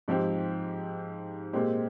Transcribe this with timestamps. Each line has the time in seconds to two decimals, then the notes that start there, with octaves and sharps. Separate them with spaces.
0.08 G#2 F3 C4 G4
1.53 A#2 G#3 C4 G4